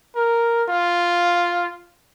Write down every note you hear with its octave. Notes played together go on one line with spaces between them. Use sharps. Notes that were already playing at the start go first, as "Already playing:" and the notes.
A#4
F4